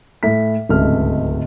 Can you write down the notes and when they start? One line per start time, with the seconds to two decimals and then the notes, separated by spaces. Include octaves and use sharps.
0.23 A2 B6
0.69 D1 C#2 G#2 C3 A3 F6